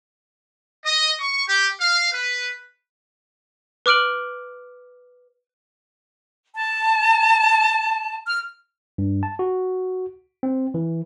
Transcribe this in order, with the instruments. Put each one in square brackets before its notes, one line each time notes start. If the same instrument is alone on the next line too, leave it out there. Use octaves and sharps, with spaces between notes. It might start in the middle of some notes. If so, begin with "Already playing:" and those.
[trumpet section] D#5
C#6
G4
F5
B4
[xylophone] B4 D6 F6 D7 F#7
[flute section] A5
F6
[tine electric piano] G2
A5
F#4
C4
E3